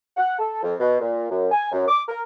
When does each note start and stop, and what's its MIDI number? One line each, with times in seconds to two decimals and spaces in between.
0.17 0.36 78
0.39 0.60 69
0.63 0.75 41
0.79 0.99 47
1.00 1.30 46
1.30 1.46 42
1.52 1.68 80
1.72 1.87 42
1.88 2.01 86
2.09 2.21 70